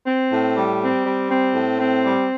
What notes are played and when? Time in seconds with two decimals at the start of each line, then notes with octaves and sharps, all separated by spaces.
0.07 C4
0.33 A2
0.56 G3
0.82 C4
1.06 G3
1.30 C4
1.55 A2
1.79 C4
2.05 G3